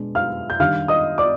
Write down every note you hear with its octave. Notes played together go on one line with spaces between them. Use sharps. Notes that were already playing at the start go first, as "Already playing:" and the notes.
Already playing: B2 G#3 B3 D4
F5 F6
G6
D#3 G3 D4 F5 F6
D#5 D#6
D5 D6